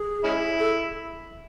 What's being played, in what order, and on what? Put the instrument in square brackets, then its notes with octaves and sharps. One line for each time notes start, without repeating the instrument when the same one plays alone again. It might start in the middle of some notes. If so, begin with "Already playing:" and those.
Already playing: [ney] G#4
[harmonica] G#3 C#4 E4
[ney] A4